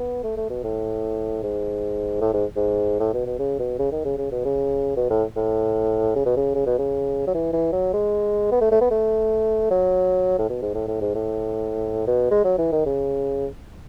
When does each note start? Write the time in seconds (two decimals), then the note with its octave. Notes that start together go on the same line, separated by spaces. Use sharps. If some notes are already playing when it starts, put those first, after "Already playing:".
Already playing: B3
0.24 A3
0.37 A3
0.50 B2
0.64 A2
1.43 G#2
2.21 A2
2.33 G#2
2.56 G#2
3.00 A2
3.14 B2
3.27 B2
3.39 C#3
3.59 B2
3.79 C#3
3.92 D#3
4.05 C#3
4.18 C#3
4.31 B2
4.45 C#3
4.97 B2
5.10 A2
5.36 A2
6.16 C#3
6.26 B2
6.37 C#3
6.55 C#3
6.66 B2
6.79 C#3
7.27 F#3
7.34 E3
7.53 E3
7.73 F#3
7.93 G#3
8.52 B3
8.61 A3
8.71 A3
8.81 B3
8.91 A3
9.71 F#3
10.39 A2
10.49 B2
10.62 G#2
10.75 A2
10.88 A2
11.01 G#2
11.15 A2
12.07 B2
12.31 G#3
12.45 F#3
12.58 E3
12.72 D#3
12.86 C#3